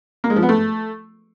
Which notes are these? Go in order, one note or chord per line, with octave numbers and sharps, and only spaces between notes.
A#3
G#3
F3
B3
A3